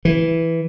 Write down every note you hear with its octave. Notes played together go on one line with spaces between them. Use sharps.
E3